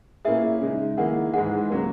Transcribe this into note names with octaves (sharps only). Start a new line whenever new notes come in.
A#2 A#3 C#4 E4 G#4 E5
C#3 G#3 D#4
D#3 A#3 E4 G#4 F#5
G#2 E3 G#3 D#4 G#4 F#5
C#3 F#3 A#3